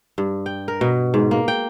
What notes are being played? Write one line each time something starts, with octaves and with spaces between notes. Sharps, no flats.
G2
G5
A#4
B2
G#2
A#3
G5